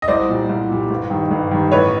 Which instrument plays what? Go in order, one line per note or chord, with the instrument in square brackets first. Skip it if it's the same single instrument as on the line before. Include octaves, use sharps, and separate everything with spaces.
[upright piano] D#5
C2 C5 D5
A#2 G3
C2
A#2 G3
G1
G2 D#3
G1
G2 D#3
A1 B4 C#5